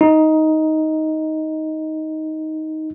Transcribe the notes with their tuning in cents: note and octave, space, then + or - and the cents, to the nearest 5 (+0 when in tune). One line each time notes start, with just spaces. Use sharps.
D#4 +10